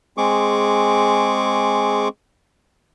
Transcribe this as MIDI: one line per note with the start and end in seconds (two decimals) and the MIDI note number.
0.17 2.08 56
0.17 2.08 60
0.17 2.08 68
0.17 2.08 85
0.17 2.08 86